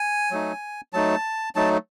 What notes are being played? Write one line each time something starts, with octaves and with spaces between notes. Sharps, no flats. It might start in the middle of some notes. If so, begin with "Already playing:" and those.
Already playing: G#5
F#3 A3 D#4
F#3 A3 D#4 A5
F#3 A3 D#4 A5